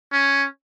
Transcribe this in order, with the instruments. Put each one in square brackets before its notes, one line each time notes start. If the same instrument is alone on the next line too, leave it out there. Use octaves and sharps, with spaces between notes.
[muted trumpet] C#4